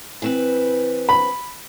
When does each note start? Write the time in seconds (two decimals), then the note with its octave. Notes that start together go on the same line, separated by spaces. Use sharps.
0.22 E3 C4 B4
1.09 B5